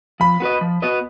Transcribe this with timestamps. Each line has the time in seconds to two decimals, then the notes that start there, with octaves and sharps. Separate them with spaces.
0.20 F3 B5
0.40 B3 F#4 B4 D#5
0.61 F3
0.82 B3 F#4 B4 D#5